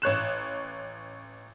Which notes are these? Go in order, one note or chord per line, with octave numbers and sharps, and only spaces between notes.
A1 C#5 F#6 E7